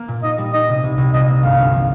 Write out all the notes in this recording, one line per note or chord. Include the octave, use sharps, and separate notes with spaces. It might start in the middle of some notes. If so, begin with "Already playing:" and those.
Already playing: A#3
A#2
D#4 D#5
G3
D#4 D#5
C3
C2
C2
C2 D#5
A#3
G1 F5
G1
F3